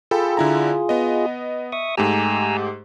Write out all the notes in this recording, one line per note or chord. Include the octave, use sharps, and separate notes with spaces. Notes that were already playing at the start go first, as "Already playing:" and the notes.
F4 G#4 A4 G5 B5
D3 E4 A#5
B3 D#5
E5 C#6 D#6
G#2 A3 G4 G#5 A#5 E6